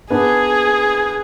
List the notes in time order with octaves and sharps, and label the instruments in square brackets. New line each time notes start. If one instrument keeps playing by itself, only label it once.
[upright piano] B3 D4 [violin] G#4